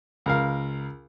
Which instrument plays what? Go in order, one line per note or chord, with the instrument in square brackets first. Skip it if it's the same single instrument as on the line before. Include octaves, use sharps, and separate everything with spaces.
[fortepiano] C#2 A#4 F5